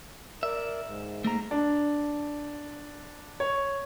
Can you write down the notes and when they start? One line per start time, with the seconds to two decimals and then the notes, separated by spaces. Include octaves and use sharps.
0.43 A#4 D5 E5
0.83 G#2
1.24 A3 A#3 A#5
1.51 D4
3.40 C#5